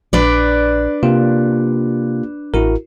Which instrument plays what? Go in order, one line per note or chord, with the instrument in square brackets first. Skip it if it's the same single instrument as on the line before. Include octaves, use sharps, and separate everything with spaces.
[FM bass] A#1 [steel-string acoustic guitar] D4 B4 D5
[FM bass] C3 [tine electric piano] A#3 F4 G4
[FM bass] A1 [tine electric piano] E4 F#4 A#4